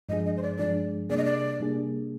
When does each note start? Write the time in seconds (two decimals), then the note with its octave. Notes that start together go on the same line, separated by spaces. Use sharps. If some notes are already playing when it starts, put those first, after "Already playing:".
0.09 G2 F3 G#3 D4 G#4 D#5
0.26 D#5
0.37 C5
0.42 D5
0.59 G2 F3 G#3 D4 G#4 D5
1.10 C3 G3 A#3 D4 G#4 D5
1.17 D#5
1.24 D5
1.60 C3 G3 A#3 D4 G#4